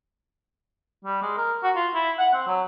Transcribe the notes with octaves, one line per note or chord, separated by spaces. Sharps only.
G3
G#3
A#4
F#4
F4
E4
F#5
C4
F#3